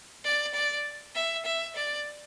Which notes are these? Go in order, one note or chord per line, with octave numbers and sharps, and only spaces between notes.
D5
D5
E5
E5
D5